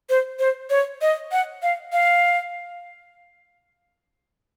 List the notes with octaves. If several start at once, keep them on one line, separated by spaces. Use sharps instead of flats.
C5
C5
C#5
D#5
F#5
F5
F5